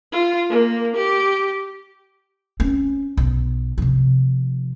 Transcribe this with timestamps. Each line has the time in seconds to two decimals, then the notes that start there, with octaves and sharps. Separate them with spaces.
0.12 F4
0.49 A#3
0.96 G4
2.60 C4 C#4
3.17 B1
3.78 C3 F3